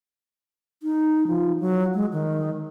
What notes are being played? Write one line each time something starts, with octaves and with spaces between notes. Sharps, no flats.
D#4
F3
F#3
G#3
D#3